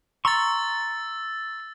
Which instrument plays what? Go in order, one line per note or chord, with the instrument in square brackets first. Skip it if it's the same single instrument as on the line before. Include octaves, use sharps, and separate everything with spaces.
[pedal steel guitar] A#5 C6 C#6 [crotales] E6 A6